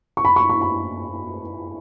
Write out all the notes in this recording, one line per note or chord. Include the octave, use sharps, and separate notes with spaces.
C#6
B5
C#6
C#6
B5